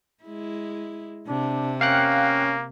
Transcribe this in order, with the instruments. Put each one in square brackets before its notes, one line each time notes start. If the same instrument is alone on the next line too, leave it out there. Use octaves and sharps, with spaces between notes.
[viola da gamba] G#3 E4
[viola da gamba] C3 [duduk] D4
[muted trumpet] A#3 [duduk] C#4 [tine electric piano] F5 G5 F#6